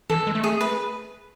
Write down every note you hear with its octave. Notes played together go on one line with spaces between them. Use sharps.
E3 A4
G#3
A3
G#4
B4